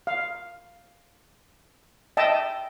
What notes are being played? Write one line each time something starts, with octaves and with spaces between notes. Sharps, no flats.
F5
D#5 E5 G5 A5